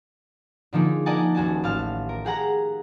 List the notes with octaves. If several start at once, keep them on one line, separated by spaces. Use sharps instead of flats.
D3 F3 A#3 D#4 G#4
A#4 D5 D#5 F#5 G#5 A5
D#1 F#4 G#5 A5
A1 F5 A5 F6
A#4
G4 G#4 F#5 A#5